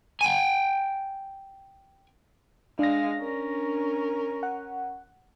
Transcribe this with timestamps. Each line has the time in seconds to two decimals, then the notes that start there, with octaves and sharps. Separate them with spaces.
0.21 G5 G#5
2.79 G#3 D4 F5 A#6
3.18 C#4 A#4
4.43 F#5